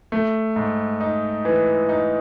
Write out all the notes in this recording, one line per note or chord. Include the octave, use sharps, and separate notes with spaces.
A3
G#2
D#4
E3
D#4